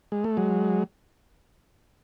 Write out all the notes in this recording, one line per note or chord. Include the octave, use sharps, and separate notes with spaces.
G#3
A3
F#3 G#3